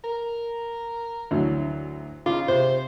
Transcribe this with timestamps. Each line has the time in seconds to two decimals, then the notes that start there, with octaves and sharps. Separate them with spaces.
0.04 A#4
1.31 D2 E3 F#3
2.26 C#3 D#4 F4 D6
2.48 C3 C5